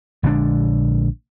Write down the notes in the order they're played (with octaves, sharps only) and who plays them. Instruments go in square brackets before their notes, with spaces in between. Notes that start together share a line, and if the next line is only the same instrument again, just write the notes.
[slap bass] A#1 D3 G#3 D4